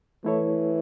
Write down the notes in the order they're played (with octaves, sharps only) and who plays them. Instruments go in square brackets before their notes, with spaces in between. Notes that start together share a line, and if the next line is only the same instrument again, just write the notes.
[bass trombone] E3 [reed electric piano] A3 E4 A4 C#5